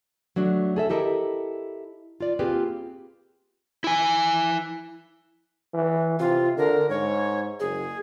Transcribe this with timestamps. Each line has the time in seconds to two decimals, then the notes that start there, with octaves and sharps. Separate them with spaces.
0.36 F#3 A3 D4 F#4
0.76 G#4 A4 E5
0.89 E4 G4 A4 A#4 D#5
2.20 F4 D5
2.39 A#3 C4 F4 G4 G#4 B4
3.84 E4 G#5
5.73 E3
6.19 C3 F4
6.57 D3 A#4
6.90 G#2 C#5
7.60 F#1 G#4